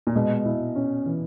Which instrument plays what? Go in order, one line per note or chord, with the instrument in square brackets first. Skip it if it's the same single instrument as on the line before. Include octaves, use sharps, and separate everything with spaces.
[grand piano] A#2
[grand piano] B2 [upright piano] G#3
[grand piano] B2 [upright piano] E4
[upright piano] C#4
E3